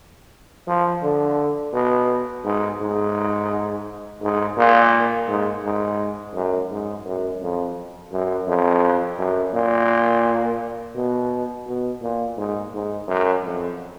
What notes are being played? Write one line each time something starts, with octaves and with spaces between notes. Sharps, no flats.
F3
D3
B2
G#2
G#2
G#2
A#2
G#2
G#2
F#2
G#2
F#2
F2
F#2
F2
F#2
A#2
B2
B2
A#2
G#2
G#2
F#2
F2